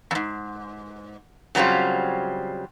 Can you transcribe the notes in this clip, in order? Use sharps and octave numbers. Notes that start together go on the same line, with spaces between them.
F2 G#2
C#3 F#3 G3 C4 F4